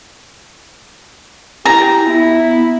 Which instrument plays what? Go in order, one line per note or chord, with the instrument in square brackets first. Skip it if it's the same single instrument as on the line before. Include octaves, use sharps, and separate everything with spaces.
[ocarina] E4 [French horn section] G4 [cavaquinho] A#5
[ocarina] B3 [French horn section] E4